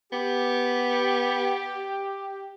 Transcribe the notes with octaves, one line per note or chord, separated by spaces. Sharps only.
B3 G4